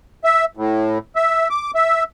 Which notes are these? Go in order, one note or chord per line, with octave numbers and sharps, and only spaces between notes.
E5
A2
E5
D6
E5